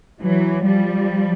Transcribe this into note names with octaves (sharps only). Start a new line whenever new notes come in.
E3 F#3
F3 G3